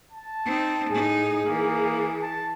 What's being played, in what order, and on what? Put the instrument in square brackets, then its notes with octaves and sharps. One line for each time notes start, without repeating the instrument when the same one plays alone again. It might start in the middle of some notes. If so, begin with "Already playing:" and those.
[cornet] A5
[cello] C4 D#4
[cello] A2 D#4 [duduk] G#4
[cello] E3 [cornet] A#3
[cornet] A5